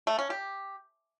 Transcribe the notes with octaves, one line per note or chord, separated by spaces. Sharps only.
A3
C#4
G4